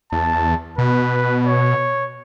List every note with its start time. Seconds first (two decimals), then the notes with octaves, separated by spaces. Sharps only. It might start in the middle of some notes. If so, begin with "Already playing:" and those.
0.12 E2 A5
0.78 B2 B4
1.46 C#5